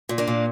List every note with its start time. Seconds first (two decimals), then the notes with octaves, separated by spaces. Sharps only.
0.09 A#2
0.18 A#3 D4
0.28 A#2